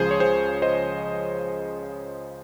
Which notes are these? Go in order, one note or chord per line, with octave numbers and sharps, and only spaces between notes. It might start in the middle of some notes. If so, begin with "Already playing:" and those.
Already playing: C#2 C#3 F3 G#4 C5
C#5
G#4 C5
C5 D#5